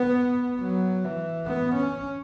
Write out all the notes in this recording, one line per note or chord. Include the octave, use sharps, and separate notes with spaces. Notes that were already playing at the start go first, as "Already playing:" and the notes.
Already playing: B3
F#3
E3
B3
C#4